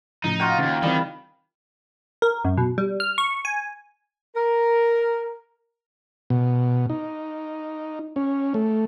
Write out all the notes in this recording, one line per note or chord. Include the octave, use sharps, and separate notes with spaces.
A2 C#3 F3 D#4
F4 F#4 G5
D#2 G#2 C#3
D#3 E3 G3 C4
A#4
F#2
B2
G3
F6
C#6
G#5
A#4
B2
D#4
C#4
A3